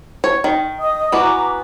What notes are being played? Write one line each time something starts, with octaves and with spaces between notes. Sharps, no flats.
C#5
D#3
D#5 D#6
E3 B3 F#4 A#5 D6